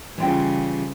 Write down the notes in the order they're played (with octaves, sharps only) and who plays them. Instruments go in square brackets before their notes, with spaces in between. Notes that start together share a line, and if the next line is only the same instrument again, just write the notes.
[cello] C#3 G3 [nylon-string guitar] E3 F4 G5